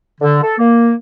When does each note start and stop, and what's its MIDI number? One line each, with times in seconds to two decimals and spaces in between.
0.20 0.37 50
0.41 0.53 69
0.58 0.92 58